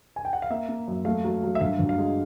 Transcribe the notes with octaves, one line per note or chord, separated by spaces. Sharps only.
G#5
G5
F#5
F5
A#3 E5
A#3
F#2
A3 F5
F#3
F#3
E5
G1 F5
G1
F5
G#3